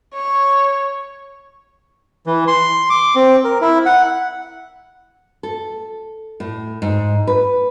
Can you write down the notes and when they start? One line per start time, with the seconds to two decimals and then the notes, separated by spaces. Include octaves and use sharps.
0.13 C#5
2.26 E3
2.47 C6
2.90 D6
3.15 C4
3.44 A#4
3.61 E4
3.86 F#5
5.43 A4
6.40 A2
6.82 G#2
7.27 B4